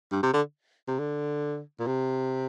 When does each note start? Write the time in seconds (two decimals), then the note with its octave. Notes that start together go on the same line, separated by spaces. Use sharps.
0.12 G2
0.23 C3
0.33 D3
0.88 C3
0.99 D3
1.79 A#2
1.87 C3